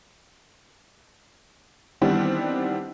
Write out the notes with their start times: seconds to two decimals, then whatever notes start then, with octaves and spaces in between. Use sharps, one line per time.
2.01 D#3 E3 G3 B3 C4 D4